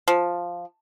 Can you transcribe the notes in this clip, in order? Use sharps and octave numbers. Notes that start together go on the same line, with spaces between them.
F3